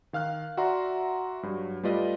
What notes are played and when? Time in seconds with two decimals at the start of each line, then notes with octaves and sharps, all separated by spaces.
0.13 D#3 F5 F6 F#6
0.57 F#4 D5 E5 F#5 A#5 C6
1.43 G2 F#3
1.83 G3 A3 F4 B4 D5 D#5